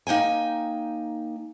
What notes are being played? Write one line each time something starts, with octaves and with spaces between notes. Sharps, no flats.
A#3 D#4 G5 G#5